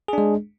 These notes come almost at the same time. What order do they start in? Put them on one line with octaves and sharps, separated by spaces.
G#4 D4 G#3